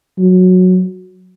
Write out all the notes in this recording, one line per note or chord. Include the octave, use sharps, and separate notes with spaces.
F#3